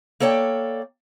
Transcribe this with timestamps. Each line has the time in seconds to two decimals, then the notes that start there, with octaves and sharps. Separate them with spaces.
0.20 A#3 A4 C#5 D5 G5